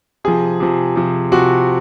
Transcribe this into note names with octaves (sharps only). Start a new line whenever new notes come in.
C3 F3 G#4
C3 F3
C3 F3
C3 F3 F#4